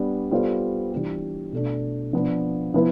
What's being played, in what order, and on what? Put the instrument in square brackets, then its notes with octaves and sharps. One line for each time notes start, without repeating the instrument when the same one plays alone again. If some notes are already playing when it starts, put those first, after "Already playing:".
Already playing: [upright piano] G3 B3 D4
G3 B3 F4 A4 C5
E3 G3 D4 G4
B2 A3 D4
F3 B3 D4
F3 B3 E4 B4